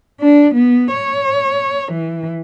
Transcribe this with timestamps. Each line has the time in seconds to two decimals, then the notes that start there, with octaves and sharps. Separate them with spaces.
0.21 D4
0.55 B3
0.93 C#5
1.92 E3